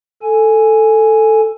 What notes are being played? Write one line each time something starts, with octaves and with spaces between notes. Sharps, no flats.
A4 G#5